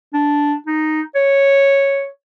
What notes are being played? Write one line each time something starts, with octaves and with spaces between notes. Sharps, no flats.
D4
D#4
C#5